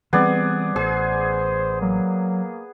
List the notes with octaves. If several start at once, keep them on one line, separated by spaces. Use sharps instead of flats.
E3 G3 B3 C4 G#4 D5
A1 G#4 C5
F#3 A#3